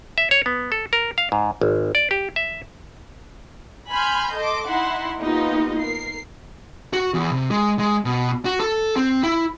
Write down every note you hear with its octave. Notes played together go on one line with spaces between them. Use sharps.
E5
C#5
B3
A4
A#4
F5
G#2
G#1
D5
G4
E5
G#5 B5 C6 F6 G6
A4 D#5 C6 D6
D#4 E4 F#5 C6
A#3 B3 D#4 F4 G4 D#5
A#4 C7
F#4
E2
C3
G#3
G#3
B2
F#4
A4
C4
E4